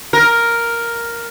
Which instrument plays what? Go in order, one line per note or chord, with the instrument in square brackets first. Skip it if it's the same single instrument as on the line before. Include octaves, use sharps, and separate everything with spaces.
[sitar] A#4